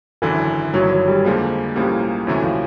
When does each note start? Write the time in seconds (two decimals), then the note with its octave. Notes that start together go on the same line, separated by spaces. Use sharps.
0.22 G#1 F#2 D3 E3 F#3
0.74 G1 G2 D#3 F#3
0.91 F#3
1.08 G3
1.24 F2 D3 F3 G#3 A#3
1.76 B1 A2 F3 G3 A#3 C#4
2.27 D2 C3 E3 F#3 A3 C#4
2.44 F3